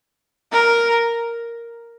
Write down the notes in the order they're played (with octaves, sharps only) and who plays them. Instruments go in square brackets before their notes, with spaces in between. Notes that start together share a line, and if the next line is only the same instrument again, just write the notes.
[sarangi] A#4